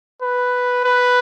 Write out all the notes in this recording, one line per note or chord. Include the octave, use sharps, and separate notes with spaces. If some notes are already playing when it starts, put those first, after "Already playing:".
B4
B4